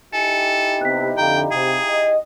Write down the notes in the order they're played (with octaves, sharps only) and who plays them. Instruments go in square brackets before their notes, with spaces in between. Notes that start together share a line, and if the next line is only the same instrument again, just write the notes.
[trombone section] D#4 E4 G4 [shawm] A4 [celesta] G#5 C#7
[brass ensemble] C3 B3 [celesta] F#6 B6
[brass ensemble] F2 D3 [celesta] F5 A#5 [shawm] G5
[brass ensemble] C3 [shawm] G#4
[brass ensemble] D#5